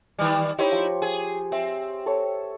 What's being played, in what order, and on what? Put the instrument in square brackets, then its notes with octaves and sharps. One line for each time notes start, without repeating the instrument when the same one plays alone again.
[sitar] D#3 G3
[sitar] D#4 E4 [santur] G4 C5 C#5
[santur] F3
[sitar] G#4
[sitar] C4 [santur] E5
[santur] A4 C#5